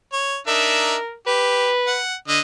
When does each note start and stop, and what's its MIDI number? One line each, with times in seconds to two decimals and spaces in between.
0.13 0.37 73
0.47 0.95 62
0.47 0.95 63
0.47 1.14 70
0.47 0.95 76
1.27 1.71 67
1.27 1.99 71
1.87 2.14 78
2.28 2.40 50
2.28 2.40 75